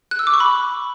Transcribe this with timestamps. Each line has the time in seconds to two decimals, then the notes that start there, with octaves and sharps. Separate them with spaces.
0.11 F#6
0.19 E6
0.27 D6
0.34 C#6
0.40 B5